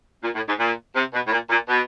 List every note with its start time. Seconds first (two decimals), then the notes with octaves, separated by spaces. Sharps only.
0.23 A#2
0.35 A2
0.47 G#2
0.59 A#2
0.96 C3
1.13 B2
1.27 A2
1.31 A#2
1.50 A#2
1.68 B2